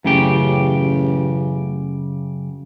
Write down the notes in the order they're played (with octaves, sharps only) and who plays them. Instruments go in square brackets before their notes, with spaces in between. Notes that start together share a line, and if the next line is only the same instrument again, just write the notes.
[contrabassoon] A1 [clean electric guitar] F#2 C#3 G4